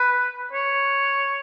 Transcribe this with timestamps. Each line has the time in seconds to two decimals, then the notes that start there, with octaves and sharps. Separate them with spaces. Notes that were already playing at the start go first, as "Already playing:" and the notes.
Already playing: B4
0.53 C#5